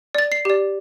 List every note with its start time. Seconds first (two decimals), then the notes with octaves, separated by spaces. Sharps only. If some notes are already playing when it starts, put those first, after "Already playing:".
0.15 D5 A6
0.32 C7
0.45 G4 D5